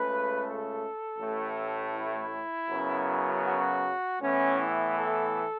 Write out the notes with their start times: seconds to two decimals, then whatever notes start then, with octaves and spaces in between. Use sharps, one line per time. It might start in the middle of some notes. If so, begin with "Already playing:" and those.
Already playing: C#2 C#3 A3 B4
0.41 A4
1.17 A1 A2 A3
1.93 E4
2.69 F#2 C#3 F#3 B3
3.46 F#4
4.21 A2 E3 B3 C#4
4.60 E4
4.98 A4